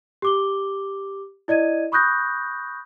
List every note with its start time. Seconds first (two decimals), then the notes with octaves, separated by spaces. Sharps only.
0.22 G4 D6 G7
1.48 E4 D5 D#5 G#6 D#7
1.92 B5 C#6 D#6 F#6 G6 A#6